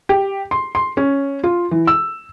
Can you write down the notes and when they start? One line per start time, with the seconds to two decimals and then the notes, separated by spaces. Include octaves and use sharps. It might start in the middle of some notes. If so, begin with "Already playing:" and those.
0.09 G4
0.51 C6
0.75 C6
0.97 C#4
1.44 F4
1.71 E3
1.87 E6